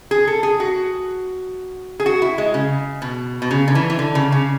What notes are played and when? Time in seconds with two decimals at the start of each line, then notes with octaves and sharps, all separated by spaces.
0.11 G#4
0.27 A4
0.43 G#4
0.60 F#4
2.00 G#4
2.06 F#4
2.22 E4
2.38 G#3
2.54 C#3
3.02 B2
3.42 B2
3.51 C#3
3.68 D3
3.75 E3
3.90 E3
3.99 D3
4.15 C#3
4.32 C#3